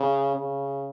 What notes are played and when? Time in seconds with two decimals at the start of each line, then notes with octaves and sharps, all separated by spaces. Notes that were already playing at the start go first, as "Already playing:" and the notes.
Already playing: C#3
0.36 C#3